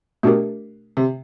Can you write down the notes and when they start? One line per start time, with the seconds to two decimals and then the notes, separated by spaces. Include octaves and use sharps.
0.23 B2 A3 D4 G4 A#4
0.97 C3